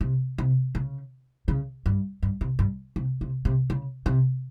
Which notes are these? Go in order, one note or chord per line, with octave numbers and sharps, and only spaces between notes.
C3
C3
C#3
C#3
G2
G2
C3
G2
C3
C3
C3
C#3
C3